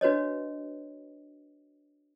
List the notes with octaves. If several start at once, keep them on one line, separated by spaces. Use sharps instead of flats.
D4 F#4 B4 C#5 D#5